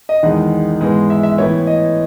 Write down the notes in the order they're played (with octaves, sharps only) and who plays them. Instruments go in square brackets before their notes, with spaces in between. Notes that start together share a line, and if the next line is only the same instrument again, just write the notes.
[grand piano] D#5
E2 D#3 G#3 F#5
G#2 E3 G#3 B3
E5
E5
A2 E3 B3 C#5
D#5